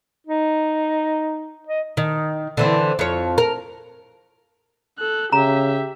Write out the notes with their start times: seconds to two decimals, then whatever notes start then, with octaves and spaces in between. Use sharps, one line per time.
0.27 D#4
1.68 D#5
1.97 D#3
2.57 D3 E3 C4
2.99 F2 C#5
3.38 A#4
4.99 A4 F#6
5.32 C#3 G4 E5 A#5